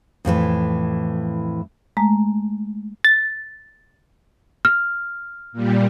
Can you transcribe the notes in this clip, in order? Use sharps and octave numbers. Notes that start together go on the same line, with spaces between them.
F2 A2 D3 E3
G#3 A3 A#5
A6
F6
A#2 G3